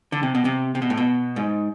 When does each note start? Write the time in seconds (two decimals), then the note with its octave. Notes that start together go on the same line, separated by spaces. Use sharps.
0.12 D3
0.23 C3
0.35 B2
0.45 C3
0.75 C3
0.82 B2
0.90 A2
0.97 B2
1.36 G#2